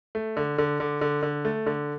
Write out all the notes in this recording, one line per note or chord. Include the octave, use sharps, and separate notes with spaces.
A3
D3
D3
D3
D3
D3
A3
D3